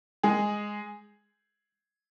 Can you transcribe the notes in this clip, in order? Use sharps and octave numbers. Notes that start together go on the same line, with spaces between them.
G#3 G#4